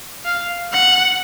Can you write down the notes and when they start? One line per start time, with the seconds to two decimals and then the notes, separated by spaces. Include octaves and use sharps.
0.25 F5
0.73 F#5